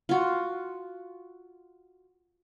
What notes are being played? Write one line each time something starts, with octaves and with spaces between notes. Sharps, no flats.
F4 F#4